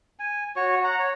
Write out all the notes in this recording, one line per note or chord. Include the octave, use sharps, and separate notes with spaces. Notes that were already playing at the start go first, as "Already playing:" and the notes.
G#5
F#4 C#5 C#6
F#5 A#5
C#5